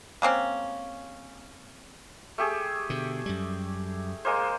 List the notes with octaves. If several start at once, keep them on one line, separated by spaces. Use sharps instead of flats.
G#3 A#3 C4 C#4
A3 G4 G#4
B2 D3
F#2 G3
G#3 A#3 C5